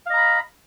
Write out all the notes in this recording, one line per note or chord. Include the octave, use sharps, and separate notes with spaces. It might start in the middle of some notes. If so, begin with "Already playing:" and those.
D#5 F5 A#5 B5